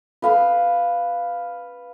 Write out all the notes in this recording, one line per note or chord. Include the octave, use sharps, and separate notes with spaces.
B4 F5 B5